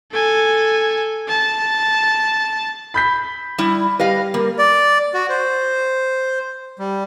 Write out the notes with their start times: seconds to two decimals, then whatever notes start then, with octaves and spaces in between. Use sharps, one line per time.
0.13 A4 G#5
1.28 A5
2.94 B5 G6 B6
3.58 G3 E4
3.99 G3 B4 D#5 F5
4.34 G3 A#3
4.59 D5
5.14 F#4
5.29 C5
6.79 G3